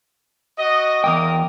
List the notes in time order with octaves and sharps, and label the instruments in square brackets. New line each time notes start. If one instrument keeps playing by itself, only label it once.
[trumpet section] F#4 D#5
[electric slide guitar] E2 G2 G5 [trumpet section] A#4 D6 D#6